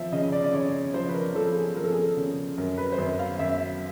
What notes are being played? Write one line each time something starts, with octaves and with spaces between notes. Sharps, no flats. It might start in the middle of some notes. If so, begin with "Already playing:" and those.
Already playing: F3 E5
C#3 D#5
D5
D5
C#3 C#5
F3 C5
B4
A#4
F3 A4
G#4
F3 A#4
A4
G#4
A4
C#3
F#2 A#4
B4
C5
F#2 B4
F5
F#2 E5